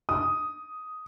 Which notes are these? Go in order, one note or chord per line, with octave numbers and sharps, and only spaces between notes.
D#6